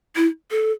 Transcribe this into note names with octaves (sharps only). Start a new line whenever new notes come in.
E4
A4